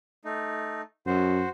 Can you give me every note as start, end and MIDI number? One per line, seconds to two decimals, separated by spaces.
0.25 0.82 57
0.25 0.82 63
1.06 1.43 42
1.06 1.49 66
1.06 1.49 72